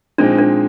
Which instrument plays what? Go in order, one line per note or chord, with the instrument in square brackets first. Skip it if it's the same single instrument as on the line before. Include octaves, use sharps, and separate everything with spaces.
[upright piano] A#2 F3 G#3 C4 D#4 [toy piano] D4
[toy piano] D4